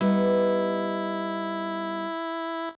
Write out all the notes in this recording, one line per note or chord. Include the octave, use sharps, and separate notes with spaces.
G3 B3 D#4 E4